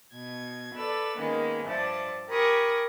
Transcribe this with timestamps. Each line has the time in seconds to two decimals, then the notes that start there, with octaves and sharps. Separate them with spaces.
0.13 B2 G#6
0.75 A4 B4 D5 E6
1.18 D#3 G#3 A#3 B3 C#4
1.65 G2 F3 D5 E5 A5
2.30 G4 A#4 G#5 B5 C#6 D#6